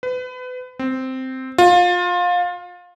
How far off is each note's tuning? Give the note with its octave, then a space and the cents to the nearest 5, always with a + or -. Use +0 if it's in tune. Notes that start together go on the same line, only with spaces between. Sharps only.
B4 +30
C4 -5
F4 +25